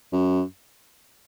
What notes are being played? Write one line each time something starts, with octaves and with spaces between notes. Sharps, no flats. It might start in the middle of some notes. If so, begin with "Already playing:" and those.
F#2